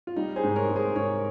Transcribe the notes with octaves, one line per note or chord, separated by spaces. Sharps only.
F4
G3 D#4
G#4 C5
G#2
A#4 C#5
G#2
G#4 C5
G#2 A#4 C#5